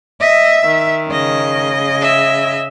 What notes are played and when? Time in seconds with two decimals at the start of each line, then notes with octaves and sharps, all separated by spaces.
0.21 D#5 E5
0.64 D#3
1.10 C#3 D#5
2.01 E5